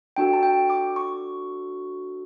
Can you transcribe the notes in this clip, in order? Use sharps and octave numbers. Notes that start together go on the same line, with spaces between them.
D4 F#4 A4 G5
A5
G5
D6
C#6